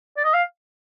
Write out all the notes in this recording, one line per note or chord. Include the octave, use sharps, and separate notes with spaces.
D5
D#5
F5